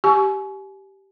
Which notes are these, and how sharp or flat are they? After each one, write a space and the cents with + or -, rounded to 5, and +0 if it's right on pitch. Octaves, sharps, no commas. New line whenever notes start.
G4 -10 G#5 +30 C#6 +15